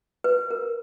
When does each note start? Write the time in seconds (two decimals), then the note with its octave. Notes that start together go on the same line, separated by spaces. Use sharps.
0.24 B4
0.51 A#4